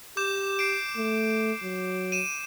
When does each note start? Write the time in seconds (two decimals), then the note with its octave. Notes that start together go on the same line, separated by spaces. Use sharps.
0.17 G4 D6 G6 E7
0.59 C7 D7
0.96 A3
1.63 F#3
2.12 D#7 E7